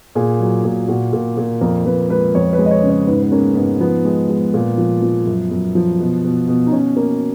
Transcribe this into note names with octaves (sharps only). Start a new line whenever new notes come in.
A#2 G#4
F#3
A#2
A#2 F#4
A#2
A#2
F2 A#4
F2 B4
G#3 B4
F2 C#5
B4
G#3
D#5
C#5
C#3
C#5
G#2 B4
B3
A#3 C#4
G#2 B3
F3 B3
G#3
G#3
A#2
F3
F3
F#2
F#2
F3
B2
B2
B2
D#4
B2 C#4
A#3